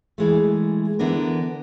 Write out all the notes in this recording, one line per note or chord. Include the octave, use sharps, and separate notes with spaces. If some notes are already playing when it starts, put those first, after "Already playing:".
E3 G#3 A3
D3 E3 B3 D4 A#4